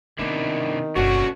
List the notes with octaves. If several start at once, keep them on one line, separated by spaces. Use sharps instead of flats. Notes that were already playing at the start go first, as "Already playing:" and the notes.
C3 D#3 B3 C4 D4 E4
F#1 B1 A3 C#4 D4 F#4